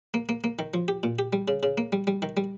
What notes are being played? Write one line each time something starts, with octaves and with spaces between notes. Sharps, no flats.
A#3
A#3
A#3
D#3
F3
G4
A#2
G4
G3
C#3
C#3
A#3
G3
G3
D#3
G3